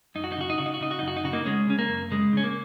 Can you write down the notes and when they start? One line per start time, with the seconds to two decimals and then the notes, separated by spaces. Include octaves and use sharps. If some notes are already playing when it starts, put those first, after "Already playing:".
0.15 F#2 D#4
0.24 F#4
0.32 D#4
0.37 C#3 F#4
0.50 D#4
0.58 C#3 F#4
0.66 D#4
0.74 F#4
0.81 C#3 D#4
0.91 F#4
0.99 F#2 D#4
1.08 F#4
1.17 D#4
1.24 C#3 F#4
1.33 A#3 D#4
1.45 C#3 G#3 C#4
1.67 C#3 C#4
1.79 A#3
1.89 F#2
2.11 C#3 G#3
2.33 C#3 C#4
2.44 A#3